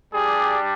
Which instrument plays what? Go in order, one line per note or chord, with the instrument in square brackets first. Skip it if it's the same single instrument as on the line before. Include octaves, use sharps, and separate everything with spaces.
[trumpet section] G3 D4 G4 G#4